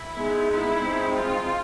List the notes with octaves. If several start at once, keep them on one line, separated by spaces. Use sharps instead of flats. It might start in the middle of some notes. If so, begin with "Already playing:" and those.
Already playing: E4
G#3 B3 D#4
E4
G#3 C4 D#4
F4